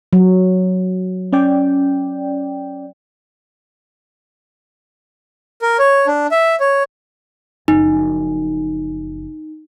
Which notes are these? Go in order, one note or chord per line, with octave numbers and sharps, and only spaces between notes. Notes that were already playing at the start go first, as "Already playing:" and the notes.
F#3
C#4 D5 G5
A#4
C#5
D4
E5
C#5
F#1 F3 D#4